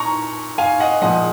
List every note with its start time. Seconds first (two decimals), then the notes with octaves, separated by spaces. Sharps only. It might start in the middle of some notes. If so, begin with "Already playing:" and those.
Already playing: A#2 A#5 C#6
0.58 F5 G#5
0.80 D#5 F#5
1.02 A#2 F3 G#3 D#5 F#5